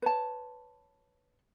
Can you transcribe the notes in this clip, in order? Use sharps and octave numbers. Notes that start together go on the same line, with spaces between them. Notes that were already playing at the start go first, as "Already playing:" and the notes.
B4 C#5 A5